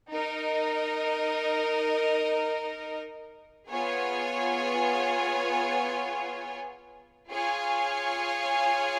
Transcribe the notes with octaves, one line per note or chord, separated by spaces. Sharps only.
D#4 A#4 D#5
B3 F4 G#4 C#5 G#5
F4 G#4 C#5 F5 G#5